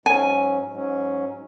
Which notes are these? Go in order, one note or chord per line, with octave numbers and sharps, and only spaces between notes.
G#2 F#3 C#4 G#5
G#2 F#3 C#4